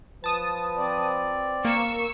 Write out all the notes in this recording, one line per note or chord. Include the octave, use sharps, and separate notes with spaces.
F3 B4 A5 D#6
C4 D5
A#3 C#6 E6